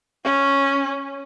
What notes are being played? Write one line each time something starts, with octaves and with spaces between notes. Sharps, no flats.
C#4